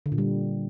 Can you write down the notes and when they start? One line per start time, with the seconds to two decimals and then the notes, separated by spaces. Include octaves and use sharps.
0.06 D3
0.12 A#2
0.18 G3